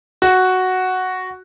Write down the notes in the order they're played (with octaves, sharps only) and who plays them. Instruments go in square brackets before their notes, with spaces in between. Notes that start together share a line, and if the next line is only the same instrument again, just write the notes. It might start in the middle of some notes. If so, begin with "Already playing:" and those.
[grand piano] F#4